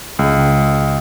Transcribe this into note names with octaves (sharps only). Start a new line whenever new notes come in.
C#2